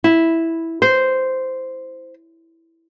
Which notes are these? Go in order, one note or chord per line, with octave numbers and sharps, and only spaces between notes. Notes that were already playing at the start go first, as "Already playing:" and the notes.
E4
C5